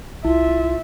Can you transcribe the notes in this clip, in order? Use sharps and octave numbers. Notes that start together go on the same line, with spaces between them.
C2 E4 F4 E5